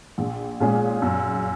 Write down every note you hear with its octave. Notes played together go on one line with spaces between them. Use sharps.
A#1
A#2 G#3 C#4 G#4
F#2